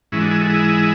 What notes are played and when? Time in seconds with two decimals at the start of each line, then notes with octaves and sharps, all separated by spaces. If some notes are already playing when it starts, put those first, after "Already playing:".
0.12 G#2 E3 G#3 C#4 E4
0.21 D4 F#4
0.31 E4 G#4
0.40 F#4 A4
0.49 E4 G#4